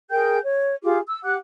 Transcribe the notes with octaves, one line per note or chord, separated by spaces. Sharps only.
G#4 A#4 G5 G6
C#5
F4 G4 G#4 D6
E6
G4 F#5 D6 F#6